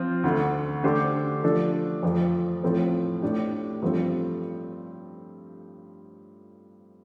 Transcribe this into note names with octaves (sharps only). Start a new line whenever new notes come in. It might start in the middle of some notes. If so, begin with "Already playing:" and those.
Already playing: F3 C4 F4
D2 D3 A3
D3 A3 D4 G4 C5
F3 A3 D4 A4
F2 F3 A3
A2 F3 C4 A4
A2 A3 D4 G4
G2 F3 A3 C4